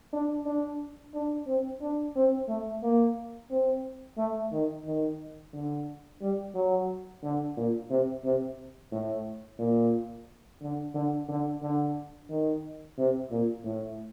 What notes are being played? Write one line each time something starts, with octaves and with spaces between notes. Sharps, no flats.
D4
D4
D4
C4
D4
C4
A3
A#3
C4
A3
D#3
D#3
D3
G3
F#3
D3
A#2
C3
C3
A2
A#2
D3
D3
D3
D3
D#3
C3
A#2
A2